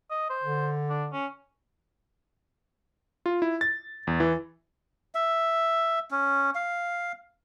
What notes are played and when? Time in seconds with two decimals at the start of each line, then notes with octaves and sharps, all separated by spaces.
0.10 D#5
0.29 C5
0.43 D3
0.90 D4
1.13 C#4
3.26 F4
3.42 E4
3.61 A6
4.07 E2
4.20 E3
5.15 E5
6.11 C#4
6.55 F5